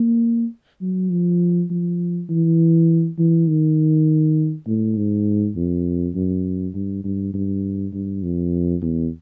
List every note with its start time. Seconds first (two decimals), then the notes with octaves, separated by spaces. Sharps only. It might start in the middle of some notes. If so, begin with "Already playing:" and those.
Already playing: A#3
0.81 F#3
1.10 F3
1.70 F3
2.29 E3
3.19 E3
3.48 D#3
4.67 A2
4.96 G#2
5.56 F2
6.15 F#2
6.74 G2
7.04 G2
7.34 G2
7.93 G2
8.22 F2
8.82 E2